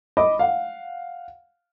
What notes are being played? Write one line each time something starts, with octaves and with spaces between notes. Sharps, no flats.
D#5 B5 D6
F5 F#5